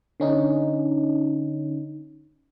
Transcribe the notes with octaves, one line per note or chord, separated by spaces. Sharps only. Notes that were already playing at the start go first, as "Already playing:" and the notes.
D3 C#4 D#4